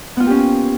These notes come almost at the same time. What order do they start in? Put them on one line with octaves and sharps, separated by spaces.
B3 F4 A#3 G4 C#4